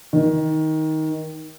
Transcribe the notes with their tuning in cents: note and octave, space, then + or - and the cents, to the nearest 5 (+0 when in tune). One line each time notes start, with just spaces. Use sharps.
D#3 +15